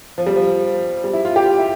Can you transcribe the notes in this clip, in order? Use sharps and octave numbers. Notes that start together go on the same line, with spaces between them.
F3
G3
F3
G3
E4
F4
G4
F4
E4